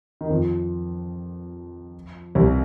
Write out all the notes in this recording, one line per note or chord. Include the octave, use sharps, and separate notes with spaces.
D#3
F2 F3
C2 C3